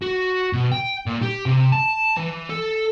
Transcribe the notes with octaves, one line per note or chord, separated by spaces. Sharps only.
F#4
B2
G5
A#2
G4
C3
A5
E3
A4